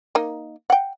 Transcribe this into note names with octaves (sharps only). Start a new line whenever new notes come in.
A#3 D#4
F#5 G5